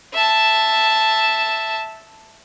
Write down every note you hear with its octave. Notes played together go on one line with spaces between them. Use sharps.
E5 A5